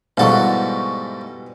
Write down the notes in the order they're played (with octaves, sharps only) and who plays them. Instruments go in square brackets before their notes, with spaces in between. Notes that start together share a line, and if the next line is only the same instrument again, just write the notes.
[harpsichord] G#2 A4 [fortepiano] B2 E3 G3 [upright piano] F5 F#5 C#6